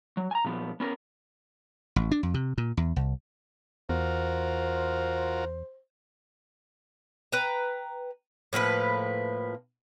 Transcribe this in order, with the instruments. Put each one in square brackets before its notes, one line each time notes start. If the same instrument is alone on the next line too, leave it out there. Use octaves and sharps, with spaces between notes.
[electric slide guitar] F#3
G#5 A#5
A#2 F3 B3
B3 C#4 A#4
[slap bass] A1
D4
F2
C3
A#2
E2
C2
[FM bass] E2 [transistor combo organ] F4 F#4 A#4 [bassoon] C5
[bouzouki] B4 G5 A#5
A2 F3 A#3 B4